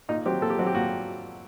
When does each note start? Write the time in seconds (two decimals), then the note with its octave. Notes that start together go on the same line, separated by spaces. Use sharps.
0.09 A#2 D#4
0.26 F#3 C4 G4
0.41 A#2 A4
0.50 G4
0.59 F#3 C4 F#4
0.66 G4
0.74 A#2 F#4